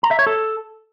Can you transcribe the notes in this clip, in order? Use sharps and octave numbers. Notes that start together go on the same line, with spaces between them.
A#5
E5
C#5
A4